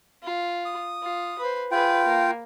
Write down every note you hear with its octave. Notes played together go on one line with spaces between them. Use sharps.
F4
D#6
F4
B4 C5
F4 G#4 B4 G5
A#3